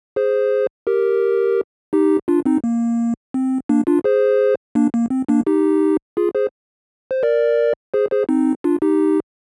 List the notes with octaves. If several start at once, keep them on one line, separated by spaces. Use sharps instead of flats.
G#4 C5
G4 A#4
D#4 G4
D4 F4
C4 D#4
A#3
C4
A#3 D4
D4 F4
G#4 C5
A#3 D4
A#3
C4
A#3 D4
D#4 G4
F4 G#4
G#4 C5
C5
A#4 D5
G#4 C5
G#4 C5
C4 D#4
D4 F4
D#4 G4